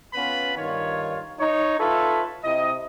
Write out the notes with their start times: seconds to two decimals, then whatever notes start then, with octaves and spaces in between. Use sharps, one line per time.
0.14 B3 C#4 F4 B4 B5
0.57 G2 D#3 F4 C#5
1.40 D#4 C#5
1.79 F4 A4 B4 C#5 E5
2.44 C3 E4 D#5